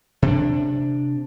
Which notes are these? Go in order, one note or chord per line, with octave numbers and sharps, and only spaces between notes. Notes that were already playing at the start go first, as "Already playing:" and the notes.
C3 C4 D4